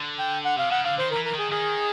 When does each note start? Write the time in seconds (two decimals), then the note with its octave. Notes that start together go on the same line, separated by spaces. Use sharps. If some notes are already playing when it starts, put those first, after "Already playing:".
Already playing: D3
0.19 G5
0.45 F#5
0.57 C3 F5
0.70 C#3 F#5
0.85 D3 F5
0.98 D#3 C5
1.11 A#4
1.16 E3
1.25 A#4
1.34 D#3 G#4
1.51 D#3 G#4